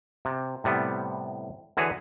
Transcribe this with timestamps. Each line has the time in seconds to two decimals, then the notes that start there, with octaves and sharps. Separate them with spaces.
0.25 C3
0.64 A2 C3 G3 B3
1.77 D3 E3 F#4 G#4 B4 C#5